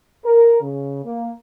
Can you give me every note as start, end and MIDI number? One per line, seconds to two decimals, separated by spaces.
0.24 0.60 70
0.61 1.01 49
1.05 1.31 58